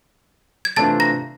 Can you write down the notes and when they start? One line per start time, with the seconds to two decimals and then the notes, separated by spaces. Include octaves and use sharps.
0.65 G#6
0.76 C3 E3 A3 D4 F4 A5 A6
1.00 A#5 A#6